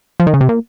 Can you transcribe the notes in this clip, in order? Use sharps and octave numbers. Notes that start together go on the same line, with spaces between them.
F3
D#3
C#3
C3
A#2